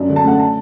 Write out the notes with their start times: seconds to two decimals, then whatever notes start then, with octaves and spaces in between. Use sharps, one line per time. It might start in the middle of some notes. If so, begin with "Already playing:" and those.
Already playing: F#2 D4
0.09 D3
0.16 A5
0.24 A3 F#5
0.40 A5